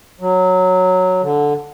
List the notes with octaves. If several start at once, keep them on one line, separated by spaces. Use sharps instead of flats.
F#3
D3